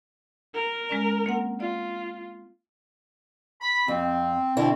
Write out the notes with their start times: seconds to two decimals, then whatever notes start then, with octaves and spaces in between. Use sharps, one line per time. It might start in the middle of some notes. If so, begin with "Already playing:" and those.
0.54 A#4
0.89 G#3 C#4 D5
1.26 A#3 C4 F#5
1.60 F4 D5
3.61 B5
3.88 F2 C4
4.57 B2 D3 C4 E4